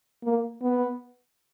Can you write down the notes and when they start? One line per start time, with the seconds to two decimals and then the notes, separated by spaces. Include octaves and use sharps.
0.24 A#3
0.62 B3